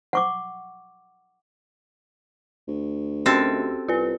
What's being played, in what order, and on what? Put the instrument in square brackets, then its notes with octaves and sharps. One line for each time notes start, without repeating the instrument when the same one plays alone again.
[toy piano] F#5 C#6 D6
[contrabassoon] D2
[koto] C4 A4 [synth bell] C#4 F#4 G4
[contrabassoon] C2 [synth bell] F4 B4